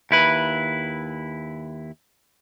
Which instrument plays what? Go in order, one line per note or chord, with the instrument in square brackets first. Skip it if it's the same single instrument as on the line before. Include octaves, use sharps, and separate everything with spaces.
[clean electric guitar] D#2 E4 B4